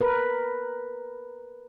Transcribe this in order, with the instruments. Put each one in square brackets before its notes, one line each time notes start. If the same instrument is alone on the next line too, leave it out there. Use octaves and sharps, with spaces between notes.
[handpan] A#4 B4